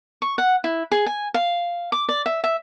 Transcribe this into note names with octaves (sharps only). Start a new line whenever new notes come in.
C#6
F#5
E4
G#4
G#5
F5
D6
D5
E5
E5